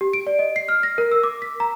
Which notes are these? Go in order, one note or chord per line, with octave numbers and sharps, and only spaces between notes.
G4
D7
D5
D#5
C7
F6
A#6
A#4
E6
D6
B6
A#5